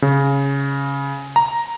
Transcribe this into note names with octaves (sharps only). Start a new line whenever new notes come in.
C#3
A#5